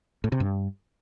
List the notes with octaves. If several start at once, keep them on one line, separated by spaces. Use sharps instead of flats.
A2
C3
G2